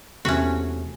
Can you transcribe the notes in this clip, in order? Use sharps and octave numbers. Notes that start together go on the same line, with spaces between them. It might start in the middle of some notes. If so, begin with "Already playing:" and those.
E2 C3 A3 C#4 F#4